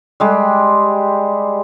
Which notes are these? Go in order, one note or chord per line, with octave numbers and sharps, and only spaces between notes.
G3 G#3 G4